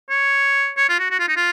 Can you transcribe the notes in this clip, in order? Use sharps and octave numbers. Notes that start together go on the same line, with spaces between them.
C#5
C#5
F4
F#4
F#4
F4
D#4
F4